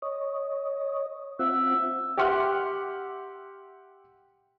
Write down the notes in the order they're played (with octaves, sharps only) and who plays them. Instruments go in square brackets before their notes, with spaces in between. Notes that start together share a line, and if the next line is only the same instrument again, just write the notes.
[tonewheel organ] C#5 D#5
[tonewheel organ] C4 F4 F#5 [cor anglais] E5
[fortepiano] G4 E5 F#5 C6 F6